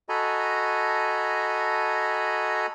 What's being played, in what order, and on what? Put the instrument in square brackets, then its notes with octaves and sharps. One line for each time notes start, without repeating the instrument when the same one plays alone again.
[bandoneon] F#4 A4 D#5 G#5 A#5 B5